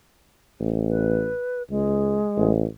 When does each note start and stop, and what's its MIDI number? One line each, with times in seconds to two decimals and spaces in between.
0.60 1.30 33
0.89 1.63 71
1.70 2.19 37
1.70 2.52 56
2.37 2.65 33